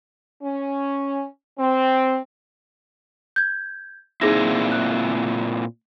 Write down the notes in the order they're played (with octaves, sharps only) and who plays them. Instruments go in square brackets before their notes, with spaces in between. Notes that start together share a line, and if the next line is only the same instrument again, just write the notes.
[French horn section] C#4
C4
[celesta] G6 G#6
[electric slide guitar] A#2 C4 E4 [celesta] D#4 G#4 A#6
[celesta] F#6